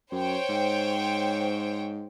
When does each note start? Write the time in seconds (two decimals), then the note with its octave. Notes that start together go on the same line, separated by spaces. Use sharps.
0.12 F#2 C5 C#5 G5
0.49 G#2